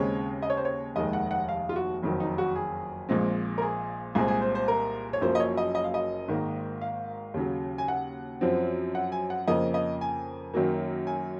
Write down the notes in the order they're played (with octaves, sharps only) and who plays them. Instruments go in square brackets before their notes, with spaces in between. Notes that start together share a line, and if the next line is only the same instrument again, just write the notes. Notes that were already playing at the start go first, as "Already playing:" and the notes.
Already playing: [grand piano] D#2 C#3 G#3 C4 C#5
D#5
C#5
C5
C#5
F1 D#2 D#3 G#3 D#5
F#5
F#5
F5
F4
F#4
F#1 F2 D#3 F#3
D#4
F#4
G#4
A#1 A#2 G#3 C4
A#4
G#4
C2 A#2 G#3 C4 G#4
G#4
C5
C5
A#4
C#5
F#1 F#2 F3 A#3 C5
D#5
C#5
D#5
D#5
F5
D#5
G#1 G#2 D#3 A#3
F5
D#2 C#3 F#3
G#5
F#5
F#2 F3 C4
F#5
G#5
F#5
F2 C#3 F3 A#3 D#5
D#5
G#5
F#2 D#3 F#3 A#3
G#5